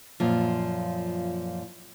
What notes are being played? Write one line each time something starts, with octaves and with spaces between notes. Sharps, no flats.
F#2 A#2 F3